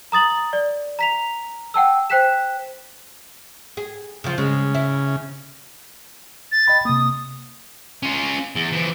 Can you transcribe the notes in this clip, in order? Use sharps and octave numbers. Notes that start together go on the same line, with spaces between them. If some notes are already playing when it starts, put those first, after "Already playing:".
A#5 D#6 A6 F#7
D5
A#5 B6 F7
F#5 G5 A5 E6
C5 G5 F#6 B6 E7
G#4
C#3 F3
C#3 G#3
E4
A6
D#5 G5 B5
C3 A#3 D#6
C#4 F4
E2
E3 F3